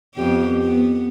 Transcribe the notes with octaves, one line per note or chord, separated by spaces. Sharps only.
F2 B3 G4
B3